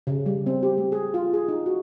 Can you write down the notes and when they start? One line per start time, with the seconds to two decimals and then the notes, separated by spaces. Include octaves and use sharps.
0.07 C#3
0.26 G3
0.46 C4
0.63 G4
0.78 A3
0.92 G#4
1.14 F4
1.33 G#4
1.48 D#4
1.66 F#4